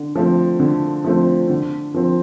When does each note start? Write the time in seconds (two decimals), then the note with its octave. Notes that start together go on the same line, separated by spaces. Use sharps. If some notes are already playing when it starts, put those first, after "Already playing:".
Already playing: D3
0.15 F3 A3 C4
0.60 D3
1.04 F3 A3 C4
1.50 D3
1.94 F3 C4